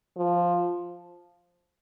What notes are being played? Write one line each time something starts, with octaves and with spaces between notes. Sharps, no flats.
F3